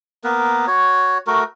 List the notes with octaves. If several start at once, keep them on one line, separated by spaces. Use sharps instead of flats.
A#3 B3 A#4 B4
F#4 C#5
A3 F#4 A#4